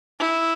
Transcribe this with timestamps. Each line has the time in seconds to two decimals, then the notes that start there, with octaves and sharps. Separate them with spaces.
0.19 E4